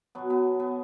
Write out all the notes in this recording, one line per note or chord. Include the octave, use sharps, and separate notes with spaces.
B2 F#3 B3
B3
B3